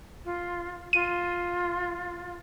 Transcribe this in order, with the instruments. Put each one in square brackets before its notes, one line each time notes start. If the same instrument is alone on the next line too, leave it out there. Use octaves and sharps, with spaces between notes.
[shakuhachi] F4
[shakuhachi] F4 [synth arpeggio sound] D#7